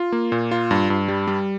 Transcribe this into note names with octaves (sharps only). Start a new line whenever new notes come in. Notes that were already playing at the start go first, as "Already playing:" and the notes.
Already playing: F4
A#3
A#2
F4
G2
G2
G3
G3